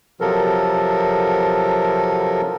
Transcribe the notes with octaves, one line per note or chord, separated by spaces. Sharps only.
C3 F3 F#3 A4 A#4